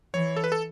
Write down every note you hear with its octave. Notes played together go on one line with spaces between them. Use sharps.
E3 C#5
A4
B4
A4